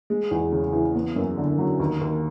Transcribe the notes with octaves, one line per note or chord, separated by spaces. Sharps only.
G#3
E2
C#3
E3
B3
F#2
D3
F#3
D#2
D#2